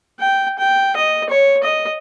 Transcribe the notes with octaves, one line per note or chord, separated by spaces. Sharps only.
G5
G5
D#5
C#5
D#5